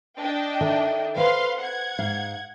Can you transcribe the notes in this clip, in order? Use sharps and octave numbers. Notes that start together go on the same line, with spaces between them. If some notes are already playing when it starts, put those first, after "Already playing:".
D4 D#5 G5
D#3 A4 E5
B4 C5 F5 C6
F#5 G#6
G#2 F5